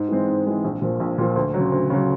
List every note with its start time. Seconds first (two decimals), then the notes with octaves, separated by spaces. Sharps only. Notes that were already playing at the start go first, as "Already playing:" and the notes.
Already playing: G#2
0.09 E3 G#3 C4
0.28 G#2
0.45 E3 G#3 C4
0.64 A#1
0.82 A#2 F3
1.00 A#1
1.18 A#2 F3
1.36 D2
1.54 C#3 F#3
1.72 D2
1.90 C#3 F#3